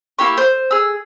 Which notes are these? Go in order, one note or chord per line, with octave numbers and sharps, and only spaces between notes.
A#3 E4 G4 C#6
C5
G#4 E6